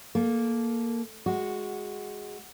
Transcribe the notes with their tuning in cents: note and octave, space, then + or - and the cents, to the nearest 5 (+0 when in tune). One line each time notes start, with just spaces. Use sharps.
A#3 +0 A4 -20
G#3 +0 F#4 +0